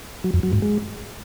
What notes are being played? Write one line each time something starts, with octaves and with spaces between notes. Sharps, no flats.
F#3
F2
F#3
G#2
G#3